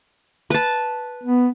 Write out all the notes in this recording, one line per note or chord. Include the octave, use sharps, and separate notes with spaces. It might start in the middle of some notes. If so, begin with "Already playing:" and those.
B4 A5
B3